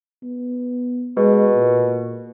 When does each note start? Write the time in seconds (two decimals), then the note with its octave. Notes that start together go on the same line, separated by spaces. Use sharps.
0.23 B3
1.17 B2 G#3
1.55 A#2